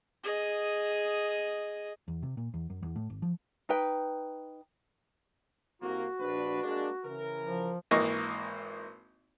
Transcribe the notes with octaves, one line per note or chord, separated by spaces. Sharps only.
G#4 D#5
E2
C3
A#2
E2
F#2
E2
A2
G#1
F3
D#4 B4 G5
C2 A#3 F#4
A#1 D4 B4
G#3 A#3 D4
C#3 E3 A#4
F3
G#1 E3 A#3 D#5 C#6